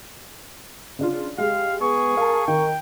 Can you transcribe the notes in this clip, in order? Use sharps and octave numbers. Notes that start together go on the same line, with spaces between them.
C#3 D4 F4
G#3 G4 F5
B3 G#4 C#6
A#4 F5 A5
D#3 A#4 G5